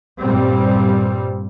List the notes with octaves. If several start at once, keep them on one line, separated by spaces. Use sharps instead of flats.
G2 A#2 G3 C4